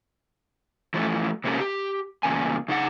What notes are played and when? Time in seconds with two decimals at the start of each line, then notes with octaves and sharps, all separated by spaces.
0.94 E3 F3 A3 E4
1.44 C3 A#3 C#4 G4 A#4 A#5
1.60 G4
2.23 E2 A#2 C#3 A#3 G#5
2.68 C#3 D#4 G#4 F#5